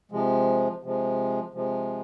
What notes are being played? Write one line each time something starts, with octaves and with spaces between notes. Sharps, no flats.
C3 F3 G#3
C3 F3 G#3
C3 F3 G#3